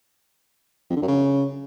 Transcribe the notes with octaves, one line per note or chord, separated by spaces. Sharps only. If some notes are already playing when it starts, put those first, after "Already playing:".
F2
D3
F#2
C#3